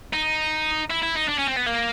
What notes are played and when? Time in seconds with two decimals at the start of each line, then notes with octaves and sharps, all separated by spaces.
0.14 D#4
0.90 E4
1.03 E4
1.16 D#4
1.29 D4
1.39 C#4
1.47 C4
1.57 B3
1.67 A#3